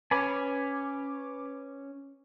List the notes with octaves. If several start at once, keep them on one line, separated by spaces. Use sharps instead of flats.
C#4 B4 G#5 B5 D6